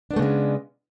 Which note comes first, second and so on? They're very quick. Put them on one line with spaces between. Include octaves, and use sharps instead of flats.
D4 B3 A3 C#3 G#3